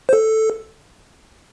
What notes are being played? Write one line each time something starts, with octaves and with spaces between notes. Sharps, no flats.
C5
A4